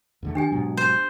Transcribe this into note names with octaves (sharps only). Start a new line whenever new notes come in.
E2 D3 A3
D#3 D4 G4 G#5
G#2 B2 F#3
C5